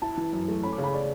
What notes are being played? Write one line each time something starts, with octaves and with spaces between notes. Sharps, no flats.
E4 A5
E3
F#2
A3
C#4 B5
D6
C#3
B5
D5